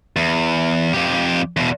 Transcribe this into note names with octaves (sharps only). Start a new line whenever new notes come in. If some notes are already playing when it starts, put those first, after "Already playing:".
E2
F2 G4
E2 B2